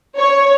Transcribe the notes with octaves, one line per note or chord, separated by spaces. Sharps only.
C#5